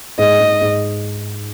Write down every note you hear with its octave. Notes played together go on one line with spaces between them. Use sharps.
G#2 D#5
G#2
G#2